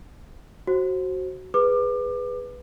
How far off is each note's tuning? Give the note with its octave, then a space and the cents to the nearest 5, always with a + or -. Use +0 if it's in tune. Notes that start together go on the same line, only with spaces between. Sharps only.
F#4 +10 C5 +20
G#4 -10 B4 +0 D6 +25